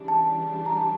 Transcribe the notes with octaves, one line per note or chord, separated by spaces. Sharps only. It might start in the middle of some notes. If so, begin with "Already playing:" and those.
Already playing: C#3 E3 G3 D4
A5
A#5
A5